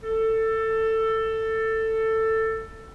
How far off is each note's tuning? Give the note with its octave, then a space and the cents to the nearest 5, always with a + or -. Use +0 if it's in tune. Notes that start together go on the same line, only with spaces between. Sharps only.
A4 +15